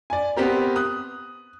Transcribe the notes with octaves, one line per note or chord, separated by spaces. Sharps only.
D5 G#5
B3 C4 G4 A#4
D#6 F#6